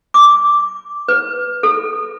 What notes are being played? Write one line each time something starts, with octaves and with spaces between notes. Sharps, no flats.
D6
B4
A4